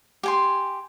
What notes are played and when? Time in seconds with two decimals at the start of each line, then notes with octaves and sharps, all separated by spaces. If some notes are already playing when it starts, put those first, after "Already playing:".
0.23 G4 G#5 C6